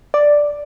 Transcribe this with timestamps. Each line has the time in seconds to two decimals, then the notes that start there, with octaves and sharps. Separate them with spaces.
0.14 D5